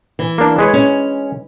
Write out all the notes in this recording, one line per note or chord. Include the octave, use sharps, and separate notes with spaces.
E3
A#3 D4
G#3 B4 C#5
C#4